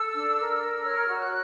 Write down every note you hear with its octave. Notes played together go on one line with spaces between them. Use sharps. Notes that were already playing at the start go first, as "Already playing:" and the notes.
Already playing: A4 E6
D4
A#4
A#4
C#5 F6
F#4
F#6